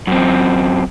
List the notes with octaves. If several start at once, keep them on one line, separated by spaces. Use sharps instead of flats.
F#2 C4